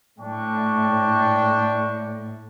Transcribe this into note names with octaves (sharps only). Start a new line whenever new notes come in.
A2 D4 G5 C#6